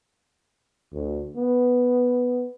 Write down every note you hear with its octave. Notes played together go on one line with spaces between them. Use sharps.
D2
B3